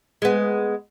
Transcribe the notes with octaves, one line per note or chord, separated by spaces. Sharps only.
G#3 B3